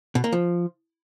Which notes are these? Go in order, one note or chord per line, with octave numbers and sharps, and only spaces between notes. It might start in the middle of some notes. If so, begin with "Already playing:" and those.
B2
A#3
F3